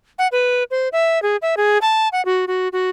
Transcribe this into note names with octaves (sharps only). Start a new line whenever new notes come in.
F#5
B4
C5
E5
G#4
E5
G#4
A5
F#5
F#4
F#4
F#4